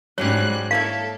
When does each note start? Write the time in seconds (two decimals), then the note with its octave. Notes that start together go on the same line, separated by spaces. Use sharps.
0.18 G#2 F#3 G3 C4 C#4 C#5 F#6
0.71 A#3 E4 A4 C#5 F5